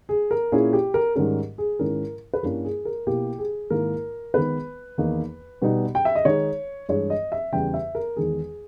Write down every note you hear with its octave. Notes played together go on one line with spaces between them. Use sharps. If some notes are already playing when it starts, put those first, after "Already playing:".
G#4
A#4
A#2 A#3 C#4 E4 G#4
G4
A#4
G#2 D#3 G3 C#4 A#4
G#4
G#2 D#3 G#3 C#4 E4 A#4
B4
G2 G3 A#3 C#4 E4 A#4
G#4
A#4
B2 A#3 E4 G4
G#4
G#2 D#3 A#3 E4 A#4
D#3 G#3 B3 B4
E2 D#3 A#3 D#4
B2 G3 B3 D#4
G5
E5
D#5
D#3 G#3 D#4 C#5
G2 E3 G#3 C#5
D#5
E5
E2 C#3 G3 G5
E5
A#4
E2 D#3 G#3 G#4